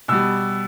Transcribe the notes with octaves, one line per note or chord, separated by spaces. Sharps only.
B2 G3 E6